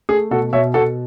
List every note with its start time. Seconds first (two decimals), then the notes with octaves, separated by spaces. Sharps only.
0.09 A3 G#4
0.31 B2 F#4 A4
0.53 B2 C#5 E5
0.74 B2 F#4 A4